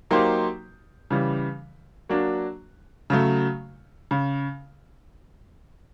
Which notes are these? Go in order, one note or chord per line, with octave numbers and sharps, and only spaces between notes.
F#3 A#3 D#4 G4 C5
C#3 E3 G3
F#3 A#3 D4 F#4
C#3 F#3 A3
C#3